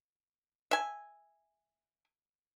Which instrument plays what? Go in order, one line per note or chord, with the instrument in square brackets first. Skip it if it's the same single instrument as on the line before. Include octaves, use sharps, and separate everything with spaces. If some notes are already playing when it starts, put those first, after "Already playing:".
[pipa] E5 G#5